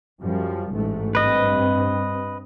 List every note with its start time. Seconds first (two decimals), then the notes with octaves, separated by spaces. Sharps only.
0.21 F#2 F3 G3
0.74 A1 G#2 A3
1.15 G2 C4 B4 D#5